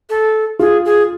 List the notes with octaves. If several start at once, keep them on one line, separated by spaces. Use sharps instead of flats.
A4
F4 G#4
G#4